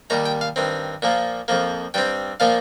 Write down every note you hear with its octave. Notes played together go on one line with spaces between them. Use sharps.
D#2 D#3 G3 A#5
G5
F5
G2 D#3 C4
A#2 F3 A#3
F2 F3 A#3
G2 G3 C4 G5
A#2 F3 A#3 F5